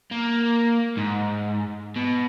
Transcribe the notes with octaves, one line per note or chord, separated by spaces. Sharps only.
A#3
G#2
B2